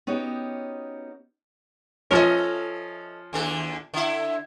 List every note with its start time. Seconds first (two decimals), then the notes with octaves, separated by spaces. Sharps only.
0.07 B3 C#4 D#4 F#4 G4 C#5
2.11 F3 C#4 A4 C5 D#5
3.33 D#2 D3 A4
3.94 D3 E4